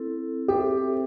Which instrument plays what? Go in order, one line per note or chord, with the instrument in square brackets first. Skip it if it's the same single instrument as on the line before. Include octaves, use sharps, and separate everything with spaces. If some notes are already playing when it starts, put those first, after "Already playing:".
Already playing: [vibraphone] C4 E4 A4
[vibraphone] C4 A4 C5 E5 [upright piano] G4